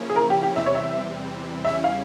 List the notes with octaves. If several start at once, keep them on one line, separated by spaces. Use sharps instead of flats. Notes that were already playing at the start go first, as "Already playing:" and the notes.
Already playing: C#3 F3 A#3 C#4 E4
G#4
A#4
G4
G4
E2 C3 E3 G3 C4 E5
C#5
E5
E2 C#3 G3 C#4 E4 E5
F5